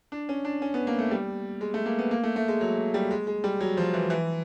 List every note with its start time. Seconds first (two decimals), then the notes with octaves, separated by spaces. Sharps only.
0.12 D4
0.29 C#4
0.45 D4
0.62 C#4
0.74 B3
0.87 A#3
0.99 A3
1.11 G3
1.61 G#3
1.74 A3
1.86 A#3
1.99 B3
2.11 A#3
2.24 A3
2.36 A3
2.48 G#3
2.61 F#3
2.94 G3
3.11 G#3
3.27 G#3
3.44 G3
3.61 F#3
3.77 F3
3.94 E3
4.10 E3